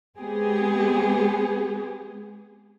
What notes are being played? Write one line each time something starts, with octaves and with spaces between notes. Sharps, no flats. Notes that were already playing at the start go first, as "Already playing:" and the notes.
G#3 B3 C4 G4 G#4